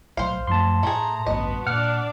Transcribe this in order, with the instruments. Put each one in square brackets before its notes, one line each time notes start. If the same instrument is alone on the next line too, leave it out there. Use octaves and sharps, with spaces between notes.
[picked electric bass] B1 A2 F#3 [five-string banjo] C5 F5
[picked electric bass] F#2 F3 A3 [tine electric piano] A5 C6
[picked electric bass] A2 [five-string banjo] A3 G#4 [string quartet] A#5
[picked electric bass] A1 D2 G2 [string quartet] B3 F#4 B4 [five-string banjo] D#5
[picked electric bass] A#2 [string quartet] D4 D5 [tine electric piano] F#5 F6